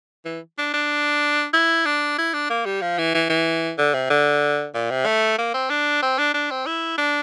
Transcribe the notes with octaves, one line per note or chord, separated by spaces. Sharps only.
E3
D4
D4
E4
D4
E4
D4
A#3
G3
F3
E3
E3
E3
D3
C3
D3
A#2
C3
A3
A#3
C4
D4
C4
D4
D4
C4
E4
D4